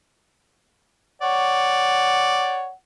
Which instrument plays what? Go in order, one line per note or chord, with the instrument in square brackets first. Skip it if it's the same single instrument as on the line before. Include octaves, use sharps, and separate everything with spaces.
[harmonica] C#5 D5 [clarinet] F#5